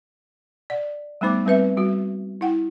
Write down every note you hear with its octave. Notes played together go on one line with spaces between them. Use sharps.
D5 F#5
G3 A3 B3 D#4 C5 D6
G3 C4 B4 E5
G3 F#4
E4 F#5 G5